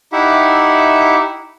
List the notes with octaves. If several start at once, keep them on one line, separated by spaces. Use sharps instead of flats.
D#4 E4 G4 E5 F#5